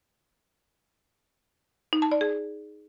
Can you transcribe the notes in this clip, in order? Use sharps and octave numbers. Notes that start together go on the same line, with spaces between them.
D#4
A5
D5
G#4